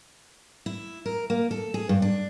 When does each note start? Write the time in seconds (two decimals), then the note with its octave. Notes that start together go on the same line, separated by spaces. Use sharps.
0.66 E4
1.06 A#4
1.30 A#3
1.51 A4
1.74 G#4
1.89 G2
2.02 D4